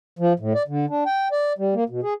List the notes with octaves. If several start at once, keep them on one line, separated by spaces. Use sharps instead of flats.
F3
A2
D5
D3
D4
G5
D5
G3
A#3
B2
G#4